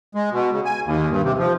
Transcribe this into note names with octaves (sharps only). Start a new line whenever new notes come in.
G#3
B2
C#3
G#5
D#2
G2
C3
F3